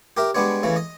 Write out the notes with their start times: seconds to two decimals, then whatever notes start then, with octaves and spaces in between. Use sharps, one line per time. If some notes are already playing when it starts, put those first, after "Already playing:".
0.17 G4 A#4 E5
0.35 G3 G#3 B3 D4 C#5
0.63 C#3 E3 A3
0.76 D#5